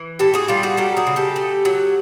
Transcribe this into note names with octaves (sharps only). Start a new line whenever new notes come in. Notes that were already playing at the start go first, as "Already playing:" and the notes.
Already playing: E3
A2 G4 A4
F#4 G#4
G3 F4 G4
F#4 G#4
F#3 G4 A4
F#4 G#4
C#3
G4 A4
A3
F#3